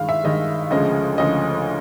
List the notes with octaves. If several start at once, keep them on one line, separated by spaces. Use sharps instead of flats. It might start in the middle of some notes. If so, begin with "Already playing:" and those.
Already playing: G2 D#3 G#3 F5
E5
G2 D#3 G#3 D#5
D2 C#3 F3 G#3 D#5
D2 C#3 F3 G#3 D#5